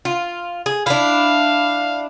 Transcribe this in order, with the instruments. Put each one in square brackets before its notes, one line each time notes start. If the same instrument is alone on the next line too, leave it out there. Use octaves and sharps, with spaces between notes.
[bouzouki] F4
G#4
[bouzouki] D4 E4 [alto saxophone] F5